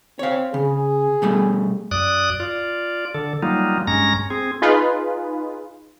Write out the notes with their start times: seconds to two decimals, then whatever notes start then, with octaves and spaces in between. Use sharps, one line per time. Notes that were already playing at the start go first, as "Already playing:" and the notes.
0.19 C4 C#5 F5
0.54 C#3 G#4
1.22 B2 G3 A3
1.91 F#2 D5 D#6 F#6
2.40 F4 D5
3.14 D3 A4
3.43 F#3 G3 A#3 D#4 F4
3.87 G2 G#3 C#4 A#5 A#6
4.30 C4 G#4
4.62 D#4 F4 G#4 B4